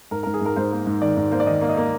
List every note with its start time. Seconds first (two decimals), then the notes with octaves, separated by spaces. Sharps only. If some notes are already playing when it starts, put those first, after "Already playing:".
0.11 G#2 A#4
0.23 A#4
0.26 G#2
0.34 G#4
0.41 G#2 A#4
0.56 G#2 C5
0.72 A#3
0.86 G#2
1.01 D#3 D5
1.17 G#2
1.31 A#3 C5
1.40 D5
1.46 D#3 D#5
1.61 A#3
1.69 D#5
1.77 A#3